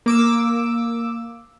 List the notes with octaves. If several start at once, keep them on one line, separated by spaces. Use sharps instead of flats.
A#3 D6 E6